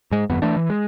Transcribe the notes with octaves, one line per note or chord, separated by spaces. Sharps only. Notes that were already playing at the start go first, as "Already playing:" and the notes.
G#2 G#3
G1 F2 B3
E3 A3 D4
E3
G#3